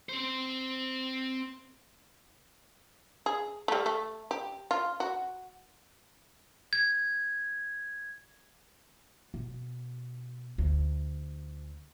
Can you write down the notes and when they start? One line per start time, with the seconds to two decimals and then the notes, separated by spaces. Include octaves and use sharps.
0.09 C4 C5
3.26 G#4
3.68 G3 A3
3.86 A3
4.31 G4
4.71 F4
5.00 F#4
6.73 G#6
9.34 B2
10.58 D2